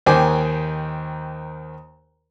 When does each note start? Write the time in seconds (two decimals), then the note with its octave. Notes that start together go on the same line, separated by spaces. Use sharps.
0.06 D#2 D#3 C5 G5 G#5 D6